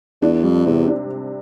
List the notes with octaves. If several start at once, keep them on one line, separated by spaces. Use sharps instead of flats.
E2 D4
F2 G3
E2 C3
D4